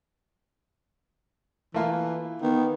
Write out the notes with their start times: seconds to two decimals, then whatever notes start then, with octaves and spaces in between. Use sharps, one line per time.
1.74 E3 A3 A#3 F4
2.42 D#3 B3